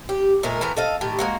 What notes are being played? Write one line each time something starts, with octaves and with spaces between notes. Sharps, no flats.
G4
A#2 G#3 A3 A#4
E3 A3 B3 A#4
A4 D#5 F5
A2 D#3 G4
G#3 A#3 F#4